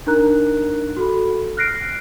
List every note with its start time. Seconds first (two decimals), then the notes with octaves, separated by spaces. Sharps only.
0.07 D4 D#4 A#4 A#5 F#6
0.97 F#4 A4 B5
1.57 F6 F#6 A#6 C7 D7